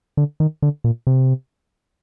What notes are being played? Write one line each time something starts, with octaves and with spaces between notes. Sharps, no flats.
D3
D#3
D3
A#2
C3